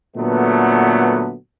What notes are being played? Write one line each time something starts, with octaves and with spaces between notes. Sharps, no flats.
A#2 D3 F#3 A3 B3